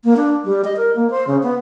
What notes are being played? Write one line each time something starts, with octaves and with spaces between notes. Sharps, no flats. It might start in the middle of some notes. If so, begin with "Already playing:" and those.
A#3
D4
G3
D#5
A#4
A#3
C5
C#3
B3